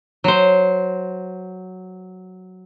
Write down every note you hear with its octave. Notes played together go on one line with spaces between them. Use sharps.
F#3 C5